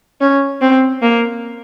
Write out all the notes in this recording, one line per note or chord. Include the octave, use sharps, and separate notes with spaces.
C#4
C4
A#3